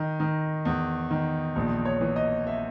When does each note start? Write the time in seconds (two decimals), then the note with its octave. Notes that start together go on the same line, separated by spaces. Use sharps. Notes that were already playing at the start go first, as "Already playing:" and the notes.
Already playing: D#3 D#5
0.20 D#3
0.65 E2
1.11 D#3
1.56 A#1
1.85 C#5
2.01 E3
2.16 D#5
2.47 E5